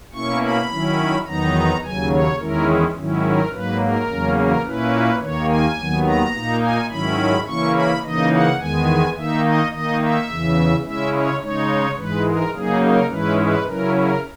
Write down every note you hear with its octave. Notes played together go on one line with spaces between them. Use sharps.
B2 A#3 C#4 E4 C#6
B5
D#3 F#3 C#4 E4
E2 D#3 F#3 B3 D#4 A#5
D#2 C#3 F#3 G#5
C#5
E2 D#3 G#3 C#4 E4 A#4
G#2 D#3 F#3 C#4 E4
A#4
G#2 F#3 A#3 B4
A#4
E2 C#3 F#3 A#3 C#4
A#4
A#2 A#3 C#4 E4 B4
D#2 D#3 A#3 C#5
G#5
D#2 D#3 F#3 B3
A#5
A#2 A#3 D#4
G#5
G#2 D#3 F#3 C#4 E4 B5
C#3 E3 A#3 C#4 E4 C#6
B5
C#3 E3 A#3 D#4 D#5
F#5
E2 D#3 G#3 B3 G#5
D#3 A#3 D#4 E5
D#5
D#3 A#3 D#4 D#5
E5
E2 C#3 E3
C#3 G#3 C#4 E4 E5
C#5
C#3 G#3 D#4 C#5
G#2 E3 G#3 B4
A#4
C#3 F#3 A#3 D#4 G#4
A#4
G#2 E3 G#3 C#4 E4 B4
B4
C#3 F#3 C#4 E4 A#4
A#4